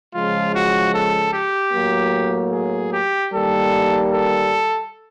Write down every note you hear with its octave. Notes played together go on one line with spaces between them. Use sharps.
C#3 F3 G#3 F4
F#4
A4
G4
A2 F#3 A#3
G#4
G4
D#3 G3 A#3 A4
A4